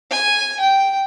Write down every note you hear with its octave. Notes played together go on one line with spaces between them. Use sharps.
G#5
G5